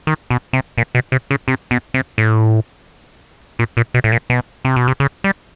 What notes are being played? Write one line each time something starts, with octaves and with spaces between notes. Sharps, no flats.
D#3
B2
C3
A#2
B2
C3
C#3
C3
B2
C3
A2
A#2
A#2
B2
A2
A#2
B2
C3
B2
C3
C#3
G3